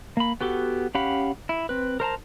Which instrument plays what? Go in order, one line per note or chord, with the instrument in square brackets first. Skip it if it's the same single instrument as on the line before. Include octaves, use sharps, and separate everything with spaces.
[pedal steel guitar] A#3 B5
B3 F#4 G4 A4
C#4 G4 F5 F#5 B5
E4
C4 B4
A#4 C5 A5 A#5